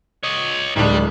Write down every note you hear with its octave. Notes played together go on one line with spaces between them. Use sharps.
C#5 D#5
D1 G3 G#3 D4